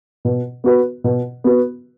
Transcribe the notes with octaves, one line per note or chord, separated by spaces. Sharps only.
B2
B3 F#4 B4
B2
B3 F#4 B4